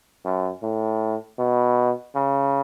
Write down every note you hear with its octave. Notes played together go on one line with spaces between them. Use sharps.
F#2
A2
B2
C#3